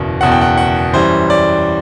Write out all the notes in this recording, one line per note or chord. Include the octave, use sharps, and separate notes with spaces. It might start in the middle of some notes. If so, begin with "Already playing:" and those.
Already playing: F#1 E2 B2
F#1 E2 B2 F#5
G5
F#5
F#5
F#2 E3 G3 C5
D5